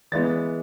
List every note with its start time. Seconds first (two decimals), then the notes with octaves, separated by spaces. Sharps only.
0.12 E3 G#3 B3 A6